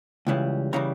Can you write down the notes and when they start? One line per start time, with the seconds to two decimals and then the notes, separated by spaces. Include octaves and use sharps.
0.27 C#2 C#3 E3 G3
0.73 C#3 E3 G3 A#5